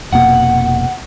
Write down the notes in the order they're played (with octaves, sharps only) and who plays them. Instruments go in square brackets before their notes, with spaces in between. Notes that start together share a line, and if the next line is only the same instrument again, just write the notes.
[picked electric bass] F1 B2 A#3 [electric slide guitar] F#5